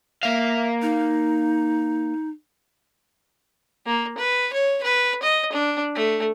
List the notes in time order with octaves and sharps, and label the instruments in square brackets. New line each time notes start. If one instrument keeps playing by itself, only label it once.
[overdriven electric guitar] A#3 F5 [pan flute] E5
[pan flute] D#4
[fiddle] A#3
B4
C#5
B4
D#5
D4
A3